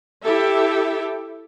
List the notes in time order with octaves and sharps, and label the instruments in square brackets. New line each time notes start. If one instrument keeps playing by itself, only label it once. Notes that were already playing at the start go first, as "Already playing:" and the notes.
[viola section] E4 G4 A4 E5